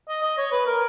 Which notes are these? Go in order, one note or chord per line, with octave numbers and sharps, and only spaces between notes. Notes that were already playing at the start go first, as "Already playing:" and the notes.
D#5
D#5
C#5
B4
A#4